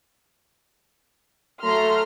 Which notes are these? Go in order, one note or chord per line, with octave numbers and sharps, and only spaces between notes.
F#3 A3 A#5 C6 F6